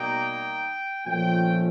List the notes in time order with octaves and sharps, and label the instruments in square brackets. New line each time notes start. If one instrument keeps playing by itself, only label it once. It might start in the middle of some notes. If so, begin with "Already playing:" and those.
Already playing: [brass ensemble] B2 G3 A#3 D#4 G5
A#2 F3 A3 C#4 G5